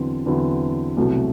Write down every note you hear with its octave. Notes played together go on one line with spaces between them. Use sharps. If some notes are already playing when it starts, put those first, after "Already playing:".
Already playing: E2 D3 F#3 C4 E4
E2 D3 F#3 C4 E4
C2 B2 F#3 A3 C4